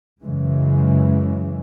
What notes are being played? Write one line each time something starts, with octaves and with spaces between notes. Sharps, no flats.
F#2 C#3 E3 G#3